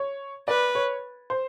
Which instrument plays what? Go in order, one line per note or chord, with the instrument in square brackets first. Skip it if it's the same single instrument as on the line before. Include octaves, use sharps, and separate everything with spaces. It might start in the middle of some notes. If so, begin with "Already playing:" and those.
Already playing: [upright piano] C#5
[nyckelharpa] B4 [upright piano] D5
[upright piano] C#5
C5